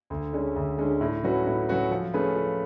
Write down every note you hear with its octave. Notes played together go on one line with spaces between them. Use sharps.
D2
D3 G#3 C#4
D2
D3 G#3 C#4
A2
F#3 C#4 F#4 B4
A2
F#3 C#4 F#4 B4
F3
A3 C#4 G#4 B4
F3